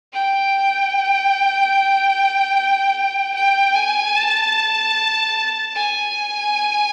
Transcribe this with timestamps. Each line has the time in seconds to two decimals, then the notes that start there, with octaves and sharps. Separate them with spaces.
0.13 G5
3.34 G5
3.75 G#5
4.15 A5
5.76 G#5